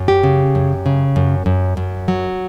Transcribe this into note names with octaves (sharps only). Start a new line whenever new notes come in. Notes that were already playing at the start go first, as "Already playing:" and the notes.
Already playing: F#2
G4
C#3
F#2
C#3
F#2
F#2
F#2
F#3